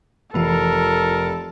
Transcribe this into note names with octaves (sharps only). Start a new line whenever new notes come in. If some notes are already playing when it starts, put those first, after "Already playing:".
F1 E3 F4 A4 A#4